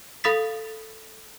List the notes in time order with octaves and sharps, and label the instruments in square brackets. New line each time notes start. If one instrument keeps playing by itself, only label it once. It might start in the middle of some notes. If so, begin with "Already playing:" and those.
[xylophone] A4 F5 B5 D#6 A6 B6